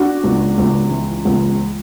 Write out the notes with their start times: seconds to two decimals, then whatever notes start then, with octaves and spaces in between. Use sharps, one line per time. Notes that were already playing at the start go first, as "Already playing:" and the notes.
Already playing: D4 F#4
0.24 C#2
0.58 C#2
0.90 E3
1.25 C#2